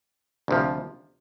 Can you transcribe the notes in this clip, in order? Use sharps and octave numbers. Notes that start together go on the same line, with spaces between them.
D2 C3 F3